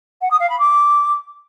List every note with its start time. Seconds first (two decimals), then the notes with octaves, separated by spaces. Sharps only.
0.21 F#5
0.30 D#6
0.40 F5
0.49 B5
0.59 D6